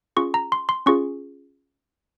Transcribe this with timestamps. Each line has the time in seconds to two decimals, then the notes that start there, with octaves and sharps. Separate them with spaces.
0.16 C#4 F4 G#4 C#6
0.34 A#5
0.52 C6
0.69 C6
0.86 C#4 F4 G#4 C#6